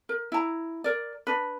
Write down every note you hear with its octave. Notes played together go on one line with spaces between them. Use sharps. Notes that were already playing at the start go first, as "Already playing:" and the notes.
A#4
E4 A#5
A#4 D5
D4 B4